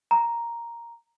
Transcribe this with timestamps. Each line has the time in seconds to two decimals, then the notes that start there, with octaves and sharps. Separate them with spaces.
0.11 A#5